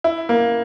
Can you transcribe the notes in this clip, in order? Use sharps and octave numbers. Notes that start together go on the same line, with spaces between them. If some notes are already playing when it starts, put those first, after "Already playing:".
E4
A#3